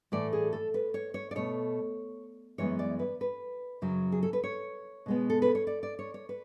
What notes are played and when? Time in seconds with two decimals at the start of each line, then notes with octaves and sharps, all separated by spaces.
0.12 A2 E3 A3 D5
0.33 G#4
0.53 A4
0.74 B4
0.94 C#5
1.14 C#5
1.31 D5
1.35 B2 A3 C#5
2.58 F#2 E3 G#3 B3 C#5
2.79 D5
2.99 B4
3.21 B4
3.82 F#2 C#3 F#3
4.12 G#4
4.23 A4
4.33 B4
4.44 C#5
5.06 B2 G#3 B3
5.30 A4
5.42 B4
5.55 C#5
5.67 D5
5.83 D5
5.99 C#5
6.14 C#5
6.29 B4